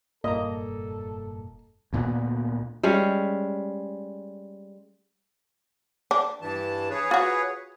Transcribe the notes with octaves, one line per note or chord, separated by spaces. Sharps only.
F1 G2 A#2 A#3 A4 D#5 A#5
D2 A#2 A3 B3
G3 G#3 C#4
D4
G2 E3 A5
G#4 B4 C#5
F4 F#4